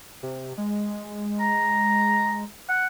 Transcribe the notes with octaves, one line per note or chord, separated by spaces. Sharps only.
C3
G#3
A#5
F#5